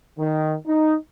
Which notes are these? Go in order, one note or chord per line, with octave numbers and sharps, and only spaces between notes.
D#3
D#4